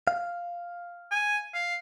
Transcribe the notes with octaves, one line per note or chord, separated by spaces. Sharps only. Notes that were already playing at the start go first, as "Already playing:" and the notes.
F5
G#5
F5